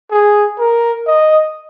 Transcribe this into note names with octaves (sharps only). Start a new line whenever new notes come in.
G#4
A#4
D#5